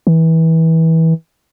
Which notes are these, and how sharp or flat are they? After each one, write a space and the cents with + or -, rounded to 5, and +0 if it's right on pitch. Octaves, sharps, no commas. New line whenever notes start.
E3 -25